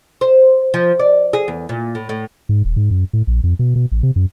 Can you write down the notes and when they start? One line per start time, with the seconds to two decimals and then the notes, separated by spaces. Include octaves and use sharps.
0.21 C5
0.74 F3
0.99 D5
1.33 G#4
1.48 E2
1.69 A#2
1.95 A2
2.09 A2
2.49 G#2
2.65 D#1
2.77 G#2
2.91 F#2
3.13 A2
3.27 A#1
3.44 F2
3.59 B2
3.76 B2
3.92 A1
4.03 C3
4.16 F#2